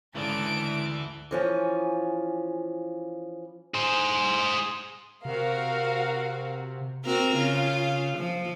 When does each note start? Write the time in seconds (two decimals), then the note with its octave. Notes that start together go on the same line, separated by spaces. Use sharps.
0.15 D2 G#2 C#3 E3 A4 D5 D7 F#7
1.31 E3 F3 C#4
3.74 G#4 C5
5.25 C3 F#4 A#4 F5
7.04 C4 F#4 A#4
7.36 C#3 F4
8.17 F3